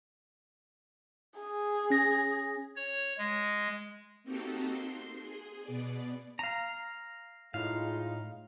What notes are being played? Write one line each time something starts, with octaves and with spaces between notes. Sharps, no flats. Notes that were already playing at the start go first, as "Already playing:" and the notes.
G#4
C#4 A#6
C#5
G#3
A#3 C4 D#4 F#4 G4 A4
C6
G#4
B2 B3 D5
F5 A#5
A2 G#3 D#4 F4 F5